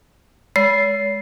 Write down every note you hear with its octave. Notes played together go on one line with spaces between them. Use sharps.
G#3 C7